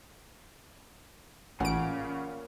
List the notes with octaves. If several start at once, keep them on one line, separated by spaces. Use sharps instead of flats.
A1 A#2 C#3 C#4 F#5 C#6 D7